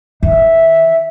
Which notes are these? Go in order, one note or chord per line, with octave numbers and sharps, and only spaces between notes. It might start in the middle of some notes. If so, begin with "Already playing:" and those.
D#3 E5